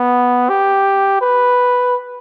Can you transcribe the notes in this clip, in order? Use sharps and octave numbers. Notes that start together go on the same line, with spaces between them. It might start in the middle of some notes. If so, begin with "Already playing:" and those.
Already playing: B3
G4
B4